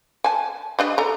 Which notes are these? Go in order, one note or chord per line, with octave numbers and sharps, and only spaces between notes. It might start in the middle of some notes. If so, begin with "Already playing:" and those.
G#5 A5
G3 D4 D#5
A4 A#5